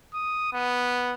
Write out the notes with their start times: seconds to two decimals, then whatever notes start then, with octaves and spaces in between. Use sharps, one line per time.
0.14 D#6
0.53 B3